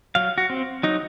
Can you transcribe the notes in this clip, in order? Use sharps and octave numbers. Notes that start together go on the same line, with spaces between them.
F#3 F5
F#4
C4
F#3 D#4